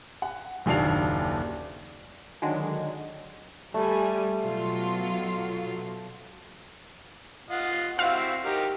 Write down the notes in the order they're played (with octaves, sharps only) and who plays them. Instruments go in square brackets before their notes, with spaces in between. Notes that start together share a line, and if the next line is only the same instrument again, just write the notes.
[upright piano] F#5
F#1 D#2 A#2 D4 C7 F7
[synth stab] D3 D#3 F#3 G#3 D4
[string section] G3 G#5 [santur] A3
[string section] B2 F#3 F4
[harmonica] F4 D#5 F#5
[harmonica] C4 E4 F#4 [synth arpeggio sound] F5
[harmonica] D#4 G4 A#4